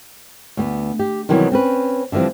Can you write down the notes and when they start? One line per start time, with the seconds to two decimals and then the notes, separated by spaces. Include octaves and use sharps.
0.57 D2 B3
0.99 G4
1.29 C3 D#3 E3 F#3 G3 B3
1.52 C4 C#4 B4
2.12 D3 E3 F3 G3 C4